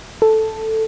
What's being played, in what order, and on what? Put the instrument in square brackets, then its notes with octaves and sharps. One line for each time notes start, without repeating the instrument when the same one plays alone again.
[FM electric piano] A4